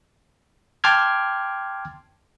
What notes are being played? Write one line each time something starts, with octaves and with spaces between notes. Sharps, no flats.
G5 A5 C6 D6 F6 G#6